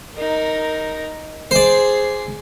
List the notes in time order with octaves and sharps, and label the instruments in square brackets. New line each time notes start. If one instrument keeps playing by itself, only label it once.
[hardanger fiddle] D#4 A#4
[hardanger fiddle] G#4 [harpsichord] C5 D5